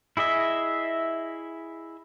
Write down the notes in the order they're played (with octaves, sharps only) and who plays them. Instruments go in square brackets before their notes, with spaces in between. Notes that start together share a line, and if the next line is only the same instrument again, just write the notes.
[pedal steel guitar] E4 G#4 D#5 E5